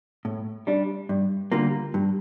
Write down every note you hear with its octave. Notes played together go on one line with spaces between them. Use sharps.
A2
G3 D4
G2
D3 G3 A#3 F4
G2